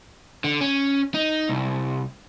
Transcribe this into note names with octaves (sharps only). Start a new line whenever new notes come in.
D3
C#4
D#4
C2